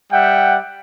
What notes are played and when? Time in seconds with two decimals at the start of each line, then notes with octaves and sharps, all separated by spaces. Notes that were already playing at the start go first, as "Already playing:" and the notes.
0.11 G3 E5 F#5 G5